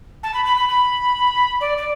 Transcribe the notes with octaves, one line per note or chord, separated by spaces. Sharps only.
A5
B5
B5
B5
B5
D5
D5